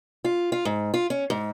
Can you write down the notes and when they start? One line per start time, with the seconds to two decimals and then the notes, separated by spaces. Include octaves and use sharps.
0.25 F4
0.52 F4
0.65 G#2
0.94 F4
1.10 C#4
1.30 G#2